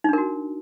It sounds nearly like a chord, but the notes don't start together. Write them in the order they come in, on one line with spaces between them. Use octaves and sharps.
D#4 D4 A#4 F#4